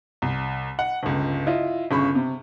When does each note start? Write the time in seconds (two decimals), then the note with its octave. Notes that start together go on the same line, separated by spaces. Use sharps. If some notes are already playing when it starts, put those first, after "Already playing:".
0.22 C2
0.79 F#5
1.03 G1 C#2
1.47 E4 F4 D#5
1.91 G1 C#3 B5 C#6
2.15 C3